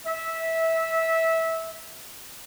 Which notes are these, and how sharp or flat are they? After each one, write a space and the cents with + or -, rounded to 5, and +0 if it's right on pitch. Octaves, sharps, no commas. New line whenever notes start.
E5 -15